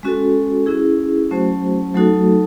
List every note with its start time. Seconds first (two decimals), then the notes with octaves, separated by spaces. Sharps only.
0.03 G#3 C#4 F#4 A4
0.66 C#4 E4 G#4
1.31 F#3 A3 C#4 F#4 C5
1.94 F#3 A3 D#4 F#4 A4